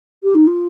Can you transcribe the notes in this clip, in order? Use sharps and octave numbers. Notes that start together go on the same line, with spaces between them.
G4
D#4
F4